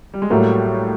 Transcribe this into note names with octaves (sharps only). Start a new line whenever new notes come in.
G3
G#3
A2 F#3 G3 A3 A#3